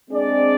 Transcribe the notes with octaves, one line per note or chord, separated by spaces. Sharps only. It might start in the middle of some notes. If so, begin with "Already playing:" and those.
G#3 C4 D4 G#4 D5